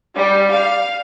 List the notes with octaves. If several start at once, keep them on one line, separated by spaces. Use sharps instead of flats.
G3
F5